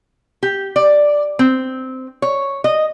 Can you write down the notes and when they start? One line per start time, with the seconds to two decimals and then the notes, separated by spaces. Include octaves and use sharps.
0.43 G4
0.76 D5
1.39 C4
2.22 C#5
2.64 D#5